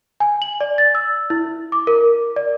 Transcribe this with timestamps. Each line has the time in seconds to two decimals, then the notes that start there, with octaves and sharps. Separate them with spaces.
0.20 G#5
0.42 F#7
0.61 D5
0.78 A6
0.95 E6
1.30 E4
1.72 D6
1.87 A#4
2.36 D5